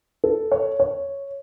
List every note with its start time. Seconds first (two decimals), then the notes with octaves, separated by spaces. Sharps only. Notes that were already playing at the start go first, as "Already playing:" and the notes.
0.24 A4
0.52 C#5
0.80 C#5